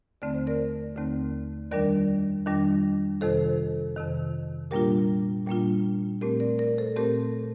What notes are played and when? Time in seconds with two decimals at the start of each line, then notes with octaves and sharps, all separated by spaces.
0.22 D#2 D3 A3 C4 D5
0.34 C5
0.47 A#4 D5
0.96 D#2 D3 A3 C4
1.71 F2 D#3 G3 D4 A#4 D5
2.46 F2 D#3 G3 D4
3.21 F2 C3 D#3 A4 C5
3.96 F2 C3 D#3
4.71 A#2 G3 A#3 D4 F4 G4 A#4
5.47 A#2 G3 A#3 D4 F4
6.21 A#2 A3 C4 G4 A#4
6.40 A#4 D5
6.58 A#4 D5
6.78 A4 C5
6.96 A#2 A3 C4 G4 A#4